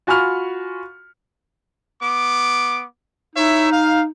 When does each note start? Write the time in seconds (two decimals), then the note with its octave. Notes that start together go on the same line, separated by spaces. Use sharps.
0.07 F4 F#4 G#5 B5 C#6 F6
2.01 B3 D6
3.35 D#4 E4 C#5 E5
3.71 F5